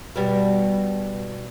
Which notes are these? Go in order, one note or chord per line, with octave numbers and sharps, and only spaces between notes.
B2 G3